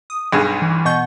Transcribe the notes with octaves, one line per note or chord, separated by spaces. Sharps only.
D#6
B1 G2 G#4
E3
B2 C#6 G6